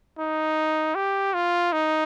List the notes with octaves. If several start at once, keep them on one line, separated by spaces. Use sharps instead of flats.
D#4
G4
F4
D#4